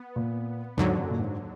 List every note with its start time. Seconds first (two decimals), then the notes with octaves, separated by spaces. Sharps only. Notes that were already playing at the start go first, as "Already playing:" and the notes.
Already playing: B3
0.16 A#2
0.78 D#2 G#2 D3 F#3
0.98 F#2
1.10 A#2
1.19 G#2